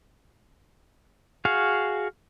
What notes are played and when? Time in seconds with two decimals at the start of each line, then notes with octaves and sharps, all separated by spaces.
1.45 F#4 G#4 F5